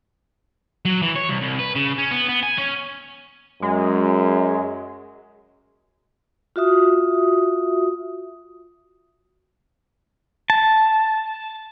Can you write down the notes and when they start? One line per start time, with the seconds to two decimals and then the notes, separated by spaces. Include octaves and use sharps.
0.85 F#3
1.02 E3
1.16 C#5
1.30 C2
1.42 C2
1.60 B4
1.76 C#3
1.98 C#4
2.11 B3
2.29 B3
2.43 G#5
2.58 C#4
3.62 F#2 G#3
6.56 F4 F#4 E5 D#6
10.50 A5